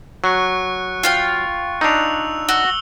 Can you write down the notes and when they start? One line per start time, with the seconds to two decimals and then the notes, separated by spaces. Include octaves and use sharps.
0.24 F#3 C#6 F#6 C#7
1.03 F4 F5 G5
1.81 D4 D#4 E6 F7
2.49 F#4 E6 G7